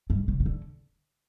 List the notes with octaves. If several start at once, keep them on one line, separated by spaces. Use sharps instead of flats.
G2
C#3
D#3
D3